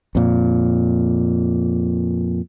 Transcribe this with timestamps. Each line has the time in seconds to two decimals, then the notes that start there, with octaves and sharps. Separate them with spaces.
0.15 F2 A#2